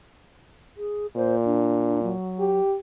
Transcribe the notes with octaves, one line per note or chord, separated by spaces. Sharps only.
G#4
A#2 C5
D4
F#3
G4